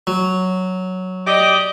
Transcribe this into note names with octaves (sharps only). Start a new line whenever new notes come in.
F#3
G4 D5 D#5